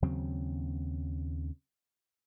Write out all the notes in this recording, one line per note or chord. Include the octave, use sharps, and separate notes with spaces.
D#2 C#3 F#3 C4